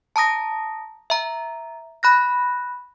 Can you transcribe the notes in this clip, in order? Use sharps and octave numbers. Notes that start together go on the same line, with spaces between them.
A5 A#5 D#6 A#6
E5 A#5
B5 F#6 A#6